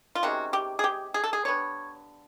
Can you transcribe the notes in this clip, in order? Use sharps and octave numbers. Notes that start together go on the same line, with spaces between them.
F4
C3 D#3 G#3 C#4 F#4
G4
G#4
G4
G#4
A4
G#4
D3 G3 B3 C#5